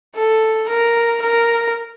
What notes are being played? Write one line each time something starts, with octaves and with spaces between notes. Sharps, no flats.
A4
A#4
A#4